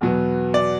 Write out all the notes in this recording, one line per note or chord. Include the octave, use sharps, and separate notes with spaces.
E2 B2 F#3 B3
D5